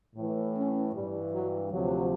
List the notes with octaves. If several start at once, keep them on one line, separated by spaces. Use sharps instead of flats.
A2 E3
C#4
G2 E3 G3
F#3
D2 C3 F3 F#3